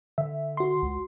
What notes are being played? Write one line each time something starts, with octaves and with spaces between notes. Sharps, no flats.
D3 E5
F#4 C6
C#2